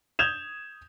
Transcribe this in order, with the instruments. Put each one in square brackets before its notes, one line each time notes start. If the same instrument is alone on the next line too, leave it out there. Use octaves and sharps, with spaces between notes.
[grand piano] D#6 G6 G#6 E7 F7